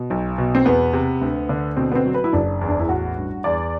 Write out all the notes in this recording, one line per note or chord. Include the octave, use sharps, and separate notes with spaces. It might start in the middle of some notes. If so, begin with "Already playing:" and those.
Already playing: B2
B1
B2
C4
E2 B3
C3
D2
D3
B2 C4
B3
C4
F#3
B4
E4
F#1 D4
E2
D4
E4
A1 F#4
G2
E2 D5